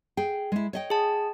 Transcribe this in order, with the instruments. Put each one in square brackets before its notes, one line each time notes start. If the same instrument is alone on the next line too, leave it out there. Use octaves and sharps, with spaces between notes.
[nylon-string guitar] G#4 G5
G#3 E4
C#5 D#5 G5
[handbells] G#4 A5